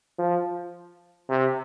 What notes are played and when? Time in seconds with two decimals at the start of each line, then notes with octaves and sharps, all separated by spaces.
0.19 F3
1.29 C3